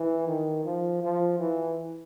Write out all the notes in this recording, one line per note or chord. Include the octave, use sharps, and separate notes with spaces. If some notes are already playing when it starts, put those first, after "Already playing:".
Already playing: E3
D#3
F3
F3
E3